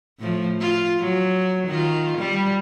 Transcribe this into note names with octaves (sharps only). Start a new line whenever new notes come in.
A2 F3
F4
F#3
D#3 F4
G3